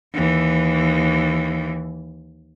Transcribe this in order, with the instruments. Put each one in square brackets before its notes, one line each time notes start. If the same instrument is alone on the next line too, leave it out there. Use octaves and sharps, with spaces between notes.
[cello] D#2 E3